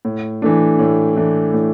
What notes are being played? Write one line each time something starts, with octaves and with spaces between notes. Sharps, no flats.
A2
E3 A3 D4
A2
E3 A3 D4
A2